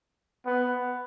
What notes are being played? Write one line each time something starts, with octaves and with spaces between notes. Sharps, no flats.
B3